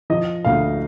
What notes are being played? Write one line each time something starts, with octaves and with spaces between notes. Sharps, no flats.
F3 D#5
D2 F5